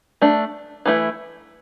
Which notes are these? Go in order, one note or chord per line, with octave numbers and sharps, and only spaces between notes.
A3 D4
E3 A3 E4